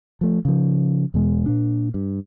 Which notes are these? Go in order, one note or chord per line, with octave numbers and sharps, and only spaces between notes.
F3 A3
C#3 F3
E2 B2 G#3
A#2 D4
G2